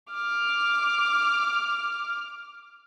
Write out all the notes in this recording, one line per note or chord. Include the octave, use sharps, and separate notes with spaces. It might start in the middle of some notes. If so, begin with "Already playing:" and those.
D6 F6